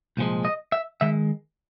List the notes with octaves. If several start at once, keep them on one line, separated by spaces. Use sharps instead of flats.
C2 A#2 F3 G#3
D#5
E5
D#3 G#3 E5